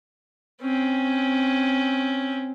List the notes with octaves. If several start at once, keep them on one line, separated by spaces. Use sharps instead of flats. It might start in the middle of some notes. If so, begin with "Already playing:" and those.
C4 C#4